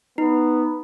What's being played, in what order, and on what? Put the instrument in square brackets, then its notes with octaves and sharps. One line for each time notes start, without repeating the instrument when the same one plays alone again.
[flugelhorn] B3 [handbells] D#4